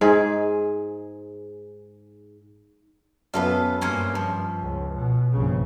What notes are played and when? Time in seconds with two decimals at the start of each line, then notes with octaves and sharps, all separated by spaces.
0.01 G#2 G#4
3.34 F#2 B3 F4 A4 B4
3.81 G2 A#3 C#4 C5
4.15 F3
4.62 C#2
4.96 B2
5.33 A#1 G2 C#3